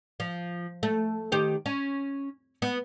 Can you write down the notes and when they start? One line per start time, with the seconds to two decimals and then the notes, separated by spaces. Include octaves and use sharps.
0.20 F3
0.83 A3
1.32 D#3 G4 C5
1.66 C#4
2.62 B3